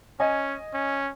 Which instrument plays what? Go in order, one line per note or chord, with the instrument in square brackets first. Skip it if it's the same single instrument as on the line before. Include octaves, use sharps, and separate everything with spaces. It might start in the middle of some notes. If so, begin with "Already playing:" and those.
[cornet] C#4 [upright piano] D#5 G#5
[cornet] C#4